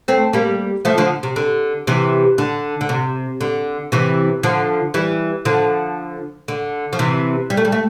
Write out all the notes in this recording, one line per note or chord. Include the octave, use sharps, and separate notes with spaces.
A3 C4
G3 A#3
F3 A3
D3 F3
C3
D3
C3 E3
D3
D3
C3
D3
C3 E3
D3 F3
E3 G3
D3 F3
D3
F3
C3 E3
G3
A3
G3
A3